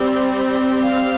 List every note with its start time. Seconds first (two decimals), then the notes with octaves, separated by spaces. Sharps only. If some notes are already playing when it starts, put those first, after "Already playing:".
Already playing: G3 C4
0.84 F5